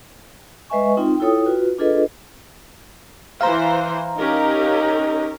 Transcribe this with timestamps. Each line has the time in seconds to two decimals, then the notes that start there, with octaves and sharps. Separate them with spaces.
0.70 G#3 B4 D#5 E5 G#5 C#6
0.97 C4 D#4 F4 G5
1.20 E4 F4 A4 C#5 G5 D#6
1.45 F4 F#4 B4
1.78 D4 F4 G#4 A4 B4 D#5
3.41 E3 C5 F5 A#5
4.17 C#4 D#4 G4 A#4